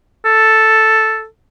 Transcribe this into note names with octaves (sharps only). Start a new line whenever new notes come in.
A4